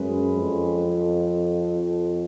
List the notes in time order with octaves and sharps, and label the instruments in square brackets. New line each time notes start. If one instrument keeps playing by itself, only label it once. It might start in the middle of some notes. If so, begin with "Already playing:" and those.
Already playing: [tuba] F#2 [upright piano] G#3 C#4 G#4 B4
[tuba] F2